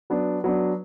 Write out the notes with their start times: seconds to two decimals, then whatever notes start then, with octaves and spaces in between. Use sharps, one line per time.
0.10 F#3 B3 D4
0.44 F#3 B3 D4